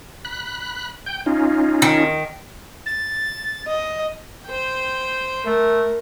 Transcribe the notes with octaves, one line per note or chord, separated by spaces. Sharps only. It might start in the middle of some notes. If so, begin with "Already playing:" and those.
B5 F#6
G5 G6
C#4 D#4 F4
D#3
A6
D#5
C5 G5
A3 A#4